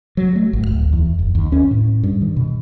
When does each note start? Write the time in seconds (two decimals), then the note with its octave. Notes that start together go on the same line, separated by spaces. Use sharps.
0.17 F#3
0.36 A3
0.53 G#1
0.67 D1
0.93 E2
1.19 F#1
1.35 D#2
1.52 C#4
1.71 A2
2.03 G2
2.21 D#3
2.37 B2